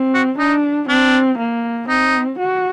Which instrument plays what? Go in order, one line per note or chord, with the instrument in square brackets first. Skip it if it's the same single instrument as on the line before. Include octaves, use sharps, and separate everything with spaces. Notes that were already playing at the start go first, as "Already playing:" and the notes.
Already playing: [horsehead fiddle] C4
[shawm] F#4
[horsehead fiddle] D4 [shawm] D#4
[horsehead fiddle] C4 [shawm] D4
[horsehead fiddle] A#3
[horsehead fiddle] C4 [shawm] D#4
[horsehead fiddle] F#4